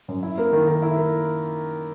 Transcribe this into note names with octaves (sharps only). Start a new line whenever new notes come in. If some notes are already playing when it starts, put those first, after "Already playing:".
F#2
E4
A#3
D#3
A#4
E4
A#3